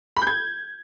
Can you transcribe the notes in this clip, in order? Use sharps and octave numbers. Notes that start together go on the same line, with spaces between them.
B5
G6
G#6